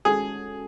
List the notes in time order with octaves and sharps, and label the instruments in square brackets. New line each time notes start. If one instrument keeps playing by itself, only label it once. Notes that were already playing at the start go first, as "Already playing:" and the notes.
[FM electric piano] G#3 C#4 F#4 A4 [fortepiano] G#4